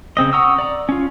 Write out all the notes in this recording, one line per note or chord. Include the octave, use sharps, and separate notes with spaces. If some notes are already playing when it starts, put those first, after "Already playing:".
C#3 C4 D#5
F#5 A#5 C#6 D#6 E6
D5 A#5
C#4 F4